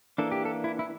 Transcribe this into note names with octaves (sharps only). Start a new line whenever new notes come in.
E3 A#3 D4 A4
G4
A4
E4
E4